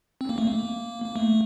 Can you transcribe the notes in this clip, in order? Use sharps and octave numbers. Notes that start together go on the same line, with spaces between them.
C4
A#3
A3
A#3
A#3
A3